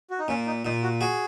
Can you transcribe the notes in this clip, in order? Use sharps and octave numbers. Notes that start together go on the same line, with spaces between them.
F#4
D#4
A#2 C#4
D#4
A#2 D#4
F#4
F#4 G#4